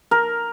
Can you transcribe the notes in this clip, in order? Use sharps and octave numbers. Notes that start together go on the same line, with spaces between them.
A#4